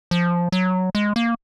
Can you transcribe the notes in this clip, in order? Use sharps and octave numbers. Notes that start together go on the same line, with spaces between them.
F3
F#3
G#3
A#3